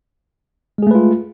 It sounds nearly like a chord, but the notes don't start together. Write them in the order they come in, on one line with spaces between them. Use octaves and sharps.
G#3 G#4 A3 B4 F4